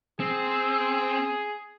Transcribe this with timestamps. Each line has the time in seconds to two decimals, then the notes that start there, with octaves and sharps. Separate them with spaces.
0.20 C4 G#4